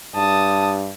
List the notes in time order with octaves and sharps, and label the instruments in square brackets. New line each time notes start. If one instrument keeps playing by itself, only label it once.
[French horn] G2 [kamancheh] A5 D#6